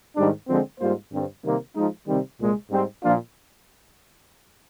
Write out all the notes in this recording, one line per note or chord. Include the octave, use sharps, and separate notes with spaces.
G#2 D#3 G3 D4
D3 F3 G#3 C4
G#2 G3 A#3 F4 C5
G2 D3 G3 C4
C3 D#3 G3 A#3
F3 G#3 D#4
C3 D#3 G3 C4
C2 A#2 G#3
G#2 G3 C4
A#2 F3 A#3 D4 F4